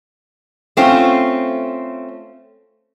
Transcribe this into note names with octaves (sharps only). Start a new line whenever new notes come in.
A3 C4 C#4 F4